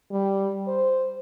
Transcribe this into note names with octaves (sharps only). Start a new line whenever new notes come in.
G3
C5